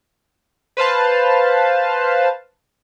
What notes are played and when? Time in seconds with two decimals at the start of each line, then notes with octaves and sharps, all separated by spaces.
0.77 B4 C5 F5 A5